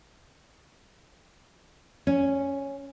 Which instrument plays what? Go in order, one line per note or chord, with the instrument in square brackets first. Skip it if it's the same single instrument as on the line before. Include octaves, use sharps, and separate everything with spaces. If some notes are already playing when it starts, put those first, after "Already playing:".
[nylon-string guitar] C#4